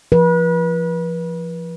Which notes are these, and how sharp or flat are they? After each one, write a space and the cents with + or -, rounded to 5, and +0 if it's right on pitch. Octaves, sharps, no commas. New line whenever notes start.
F3 -30 B4 -35